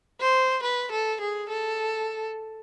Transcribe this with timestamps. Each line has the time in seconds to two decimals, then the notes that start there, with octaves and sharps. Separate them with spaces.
0.21 C5
0.63 B4
0.92 A4
1.21 G#4
1.49 A4